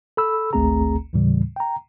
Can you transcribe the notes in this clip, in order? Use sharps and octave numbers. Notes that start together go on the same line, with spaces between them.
A4 B5 E6
G#1 D2 A3 C4 G#4 A#5
D#2 A2 C#3 E3 G3
G5 A#5